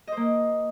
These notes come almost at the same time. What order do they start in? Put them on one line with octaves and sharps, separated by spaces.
D#5 C5 A#3